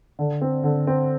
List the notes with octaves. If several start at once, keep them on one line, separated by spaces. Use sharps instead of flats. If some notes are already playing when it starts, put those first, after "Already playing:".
D3
C4
D3
C4